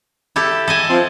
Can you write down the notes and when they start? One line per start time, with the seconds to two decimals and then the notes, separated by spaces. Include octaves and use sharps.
0.36 E4 G4 A4
0.68 A4 D#5 G#5
0.89 F3 C4